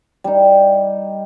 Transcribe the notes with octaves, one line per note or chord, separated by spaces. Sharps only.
G3 D#4